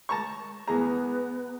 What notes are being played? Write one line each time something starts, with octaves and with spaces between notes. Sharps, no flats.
A5 A#5 C#6
E2 B3 G#4 A#5